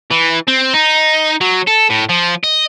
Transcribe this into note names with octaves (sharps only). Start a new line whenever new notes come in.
E3
C4
D#4
F#3
A4
A2
F3
D#5